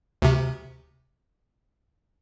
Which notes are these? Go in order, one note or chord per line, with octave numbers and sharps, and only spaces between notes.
D2 C3